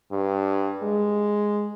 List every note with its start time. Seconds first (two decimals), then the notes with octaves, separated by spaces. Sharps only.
0.12 G2
0.83 G#3